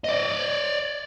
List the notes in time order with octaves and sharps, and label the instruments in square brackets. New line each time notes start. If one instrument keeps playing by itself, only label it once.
[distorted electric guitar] D5 D#5